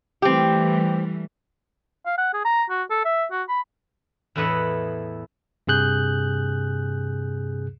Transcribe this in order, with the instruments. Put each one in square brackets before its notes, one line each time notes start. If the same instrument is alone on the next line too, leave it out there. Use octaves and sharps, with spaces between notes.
[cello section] E3 G3 A3 [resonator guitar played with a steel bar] C4 G4
[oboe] F5
F#5
G#4
A#5
F#4
A4
E5
F#4
B5
[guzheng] E2 A2 E4 B4 C#5 D#5
[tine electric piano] G2 C3 G#4 F#6 G6